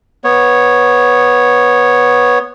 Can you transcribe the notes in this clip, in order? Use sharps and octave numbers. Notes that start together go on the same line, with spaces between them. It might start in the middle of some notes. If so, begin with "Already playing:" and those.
B3 C#5